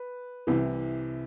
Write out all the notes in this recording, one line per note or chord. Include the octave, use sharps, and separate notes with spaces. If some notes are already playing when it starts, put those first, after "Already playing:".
Already playing: B4
C2 C3 E3